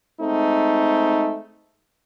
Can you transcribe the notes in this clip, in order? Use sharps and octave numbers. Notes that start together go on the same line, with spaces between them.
G#3 A3 C4 D#4